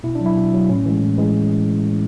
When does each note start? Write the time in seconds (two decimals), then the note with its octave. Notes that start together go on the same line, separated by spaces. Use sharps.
0.04 B2 E4
0.15 D4
0.20 F#3
0.26 E4
0.36 B2
0.53 F#3
0.69 A2 C#4
0.86 E3 G#3
1.02 A2
1.18 E3 G#3